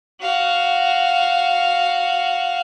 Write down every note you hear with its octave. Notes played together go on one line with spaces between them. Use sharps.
F#4 F5